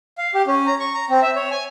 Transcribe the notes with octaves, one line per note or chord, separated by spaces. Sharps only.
F5
G4
C#4
A#5
C#6
A#5
C4
E5
C#5
G#5